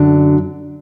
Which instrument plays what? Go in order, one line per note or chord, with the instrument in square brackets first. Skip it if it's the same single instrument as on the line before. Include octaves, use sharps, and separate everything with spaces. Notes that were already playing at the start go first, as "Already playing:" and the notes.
Already playing: [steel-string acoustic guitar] F#2 D3 F#3 D4